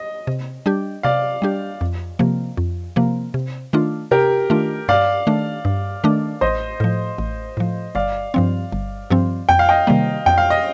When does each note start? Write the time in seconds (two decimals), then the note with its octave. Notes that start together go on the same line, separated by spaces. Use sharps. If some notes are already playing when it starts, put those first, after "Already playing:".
Already playing: D#5
0.27 C3
0.66 G3 D4 G4
1.03 C3 D5 F5
1.42 G3 D4 G4
1.81 F2
2.19 C3 F3 A#3
2.57 F2
2.96 C3 F3 A#3
3.34 C3
3.73 D#3 A3 D4 F4
4.11 C3 G4 A#4
4.50 D#3 A3 D4 F4
4.88 G2 D5 F5
5.27 D#3 A3 D4
5.65 G2
6.04 D#3 A3 D4
6.41 A1 C5 D#5
6.80 A2 F3
7.18 A1
7.57 A2 F3
7.95 G1 D5 F5
8.34 G2 F3 C4
8.72 G1
9.11 G2 F3 C4
9.49 F2 G5
9.59 F5
9.69 D#5 G5
9.87 C3 D#3 G3 A#3
10.26 F2 G5
10.38 F5
10.50 D#5